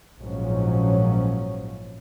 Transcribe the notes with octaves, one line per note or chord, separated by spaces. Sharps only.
A#1 G#2 F3 F#3 C#4